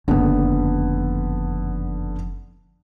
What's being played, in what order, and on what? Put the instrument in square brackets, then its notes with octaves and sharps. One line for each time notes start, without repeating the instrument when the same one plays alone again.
[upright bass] F#1 F2 [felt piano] D3 B3